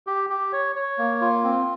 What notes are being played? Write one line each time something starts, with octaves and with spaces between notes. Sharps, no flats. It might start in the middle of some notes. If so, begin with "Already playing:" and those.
G4
G4
C#5
C#5
A#3
F4
C4